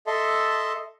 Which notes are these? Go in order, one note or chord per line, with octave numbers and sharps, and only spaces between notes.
A4 D#5 E5 A5 C6